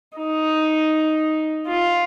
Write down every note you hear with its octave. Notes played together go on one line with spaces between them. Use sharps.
D#4
F4